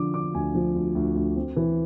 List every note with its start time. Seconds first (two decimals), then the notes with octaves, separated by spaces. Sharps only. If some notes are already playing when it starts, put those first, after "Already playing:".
Already playing: D3 F3 D6
0.14 D3 D6
0.34 D2 G#5
0.55 F3
0.75 D2
0.95 D2
1.16 D2
1.36 C4
1.56 E3